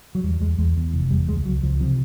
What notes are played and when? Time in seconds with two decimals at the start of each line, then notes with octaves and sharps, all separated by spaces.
0.15 F#3
0.23 E2 G3
0.40 E2 G#3
0.58 E2 G#3
0.77 E2
0.94 F1
1.11 E2 G3
1.28 C#2 G#3
1.46 C#2 F#3
1.63 C#2 F3
1.81 C3 F3